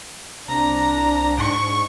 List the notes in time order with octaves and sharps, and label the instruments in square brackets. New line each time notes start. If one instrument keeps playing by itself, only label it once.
[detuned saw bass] C2 [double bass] D4 [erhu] A#5
[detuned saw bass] G#2 [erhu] C#6